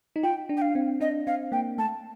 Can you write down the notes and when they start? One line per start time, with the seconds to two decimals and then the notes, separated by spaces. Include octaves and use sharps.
0.16 D#4
0.23 F4 G5
0.49 D4
0.57 G5
0.62 F5
0.75 C4
1.00 D4 D#5
1.27 C4 F5
1.52 A#3 G5
1.78 A3 A5